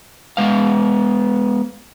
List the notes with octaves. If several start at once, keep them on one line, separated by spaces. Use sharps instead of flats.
G#3 B3 F5